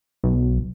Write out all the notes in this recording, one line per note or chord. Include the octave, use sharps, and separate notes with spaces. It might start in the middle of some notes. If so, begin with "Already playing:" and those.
B1